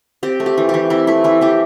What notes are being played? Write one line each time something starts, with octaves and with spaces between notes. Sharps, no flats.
C4 G4
A3
G4
E3
E3 G4
C4 E4
A3 E4
E3 E4
E3 G4